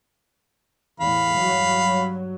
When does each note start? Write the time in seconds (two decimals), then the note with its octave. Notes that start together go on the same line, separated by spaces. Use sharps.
1.00 E2 A2 F5 B5
1.36 G2 F#3